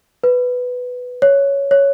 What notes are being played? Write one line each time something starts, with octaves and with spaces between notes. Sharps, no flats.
B4
C#5
C#5